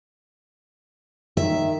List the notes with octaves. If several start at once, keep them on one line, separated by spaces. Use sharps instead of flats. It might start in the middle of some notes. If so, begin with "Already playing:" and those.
D#3 E5